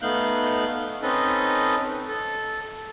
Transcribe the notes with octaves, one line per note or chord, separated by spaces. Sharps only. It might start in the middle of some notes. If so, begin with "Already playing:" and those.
A3 B3 D#4 F5 F#6 G6
C4 C#4 D#4 A4 B4 D#5
A4